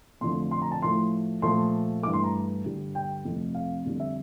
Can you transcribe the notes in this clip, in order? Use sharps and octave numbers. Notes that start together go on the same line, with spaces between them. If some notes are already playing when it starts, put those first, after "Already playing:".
F2 D3 F3 A3 C6
C6
A#5
A5
A2 F3 A3 C6
A#2 F3 A3 C6
G2 E3 A3 D6
C6
A#5
G2 D3 G3
G5
F2 C3 F3 A3
F5
F2 D3 G3
E5